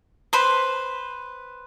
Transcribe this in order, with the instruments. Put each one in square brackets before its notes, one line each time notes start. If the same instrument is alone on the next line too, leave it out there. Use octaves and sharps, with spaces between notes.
[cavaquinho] B4 C5 B5